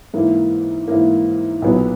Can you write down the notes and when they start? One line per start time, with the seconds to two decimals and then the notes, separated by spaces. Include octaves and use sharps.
0.14 G#2 E3 A#3
0.88 G#2 E3 A#3
1.62 B1 A#2 F#3 B3